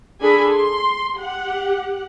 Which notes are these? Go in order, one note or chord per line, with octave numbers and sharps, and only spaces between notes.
D4 G#4 A4 G#5 B5
C6
G4 F#5